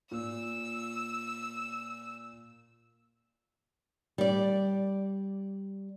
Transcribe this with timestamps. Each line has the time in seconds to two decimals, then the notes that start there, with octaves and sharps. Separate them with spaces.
0.11 A#2 E6
4.18 G3 D5